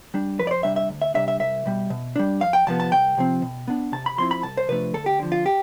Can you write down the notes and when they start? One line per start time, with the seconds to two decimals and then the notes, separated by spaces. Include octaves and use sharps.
0.14 G3 D4
0.39 F2 B4
0.47 D5
0.51 C5
0.63 C3 G3 D4 E5
0.76 E5
0.89 D2
1.02 E5
1.14 C3 G3 D4 E5
1.28 E5
1.40 C2 E5
1.66 B2 G3
1.90 B2
2.16 G3 D4
2.41 F2 F5
2.53 G5
2.67 C3 F3 B3 A5
2.80 A5
2.91 C2 G5
3.17 C3 F3 C4
3.42 B2
3.68 B3 D4
3.92 C3 A5
4.06 B5
4.18 F3 C4 E4 C6
4.31 B5
4.43 C2 A5
4.57 C5
4.68 C3 F3 A3 D4 B4
4.94 D2 A4
5.06 G4
5.19 D3 F3
5.32 F4
5.46 G4